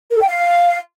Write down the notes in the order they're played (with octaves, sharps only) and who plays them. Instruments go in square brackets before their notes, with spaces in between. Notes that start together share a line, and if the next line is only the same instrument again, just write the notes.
[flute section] A#4
A4
G5
F5